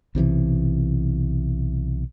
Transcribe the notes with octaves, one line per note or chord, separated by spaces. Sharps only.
B1 C3 D#3 E3